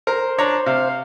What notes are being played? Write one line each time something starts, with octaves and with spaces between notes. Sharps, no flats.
A#4 C5
D4 C#5 A#5
C3 F5